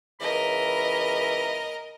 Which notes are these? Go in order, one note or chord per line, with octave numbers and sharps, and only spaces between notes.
C#2 E3 A#4 D#5 B5